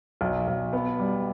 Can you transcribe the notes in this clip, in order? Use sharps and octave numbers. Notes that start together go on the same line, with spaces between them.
B1
B1
B3
G3